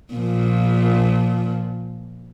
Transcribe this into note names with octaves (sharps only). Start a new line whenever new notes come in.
A#2 F3